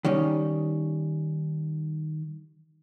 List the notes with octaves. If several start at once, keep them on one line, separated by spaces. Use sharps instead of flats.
D#3 G3 C#4